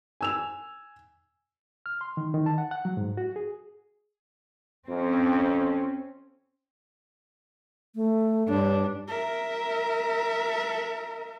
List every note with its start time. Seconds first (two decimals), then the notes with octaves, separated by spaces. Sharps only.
0.21 G#5 E6 F7
1.86 F6
2.01 C6
2.17 D#3
2.34 D#3
2.46 A5
2.58 F#5
2.71 F#5
2.85 F#3
2.97 G#2
3.17 F#4
3.36 G#4
4.89 F2 C4 C#4
7.95 A3
8.49 G2 D4 C#5
9.08 A#4 E5